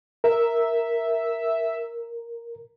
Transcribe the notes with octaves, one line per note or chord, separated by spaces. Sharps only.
A#4 E5